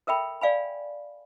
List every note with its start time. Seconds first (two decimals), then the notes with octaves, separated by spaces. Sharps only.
0.07 A4 A#4 E5 G5 B5
0.41 D5 F5 G#5 B5